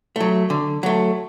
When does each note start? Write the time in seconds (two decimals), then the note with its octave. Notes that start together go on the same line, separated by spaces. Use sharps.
0.16 F#3 A3
0.50 D3
0.83 F#3 A3